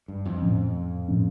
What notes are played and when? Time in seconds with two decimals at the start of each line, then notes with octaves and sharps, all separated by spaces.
0.08 G2
0.25 F2
0.42 A2 F3 C#4
1.08 A2 F3 C#4